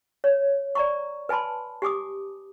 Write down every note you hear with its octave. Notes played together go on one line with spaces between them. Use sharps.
C#5
D5 A#5 C#6
B4 G#5 A5 B5 C6
G4 G#5 D6 D#6